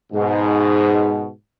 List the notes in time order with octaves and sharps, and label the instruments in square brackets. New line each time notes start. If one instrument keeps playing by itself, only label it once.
[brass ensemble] G#2 B2